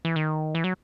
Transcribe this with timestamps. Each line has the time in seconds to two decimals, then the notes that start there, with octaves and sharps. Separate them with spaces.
0.05 E3
0.16 D#3
0.55 E3
0.64 F#3